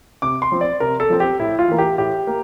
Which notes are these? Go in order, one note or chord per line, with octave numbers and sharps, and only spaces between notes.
C3 D6
C6
F3 C4
D5
C3 A#4
A4
F3 C4
G4
A2 E4
F4
E3 A#3
G4
A2 G4
A#3